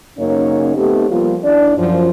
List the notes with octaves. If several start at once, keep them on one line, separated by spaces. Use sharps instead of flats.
F#2 C#3 A#3 C#4 D#4 C#5
A3 B3 C4 D#4 G4
F3 G3 A#3 B3 F4
D#2 D4 E4 D5
F#2 F3